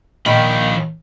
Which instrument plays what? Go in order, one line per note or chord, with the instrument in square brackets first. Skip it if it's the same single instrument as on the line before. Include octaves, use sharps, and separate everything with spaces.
[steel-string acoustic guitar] A#2 D4 [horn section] D#3 [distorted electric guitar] F3 B5